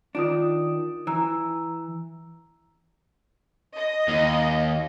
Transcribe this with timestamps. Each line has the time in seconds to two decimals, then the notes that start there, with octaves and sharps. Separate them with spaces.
0.15 D#3 D4 F4 D#6
1.07 E3 A#5 E6
3.76 D#5
4.08 D#2